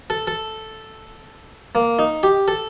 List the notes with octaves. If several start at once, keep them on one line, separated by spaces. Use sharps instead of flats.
A4
A4
A#3
D#4
G4
A4